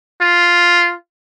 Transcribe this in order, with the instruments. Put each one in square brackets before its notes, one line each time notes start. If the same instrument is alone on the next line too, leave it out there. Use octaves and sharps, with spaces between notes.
[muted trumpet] F4